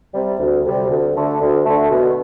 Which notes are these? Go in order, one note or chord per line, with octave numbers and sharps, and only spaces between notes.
C3 G3
D2
C3 G3
D2
D3 A3
D2
D3 A3
B2